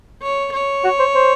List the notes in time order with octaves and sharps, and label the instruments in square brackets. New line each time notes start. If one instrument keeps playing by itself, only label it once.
[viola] C#5
C#5
[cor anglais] F#4
C5
C5